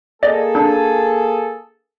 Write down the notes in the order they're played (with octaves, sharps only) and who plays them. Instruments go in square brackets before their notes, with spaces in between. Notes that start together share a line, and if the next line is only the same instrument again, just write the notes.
[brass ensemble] A#3 G#4 A4 [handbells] D5 D#5
[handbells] D4